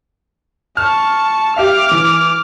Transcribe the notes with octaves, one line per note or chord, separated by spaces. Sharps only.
A5 C#6 F6
G4 E5 F5 D6 F6
E3